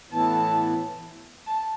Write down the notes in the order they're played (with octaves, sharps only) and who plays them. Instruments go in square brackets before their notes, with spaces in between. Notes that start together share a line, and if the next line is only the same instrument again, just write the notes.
[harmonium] A2 E3 B3 E4 [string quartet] A5
[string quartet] A5